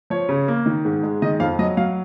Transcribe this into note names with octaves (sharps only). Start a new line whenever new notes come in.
F3 C#5
C#3
A#3
D#3
G#2
G#3
D#3 D#5
F2 F5
F#3 D#5
F#3 F5